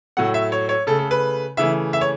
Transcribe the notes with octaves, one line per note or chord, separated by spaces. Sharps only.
A2 F#3 A3 F#5
E5
C#5
C#5
C#3 A3 A4
A4
B4
C#3 E3 A3 E5
E5
C#5